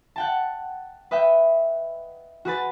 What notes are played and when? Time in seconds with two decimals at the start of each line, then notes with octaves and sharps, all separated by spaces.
0.16 F#5 G5 A5
1.11 B4 D#5 E5 G5
2.45 F#4 G#4 B4 A6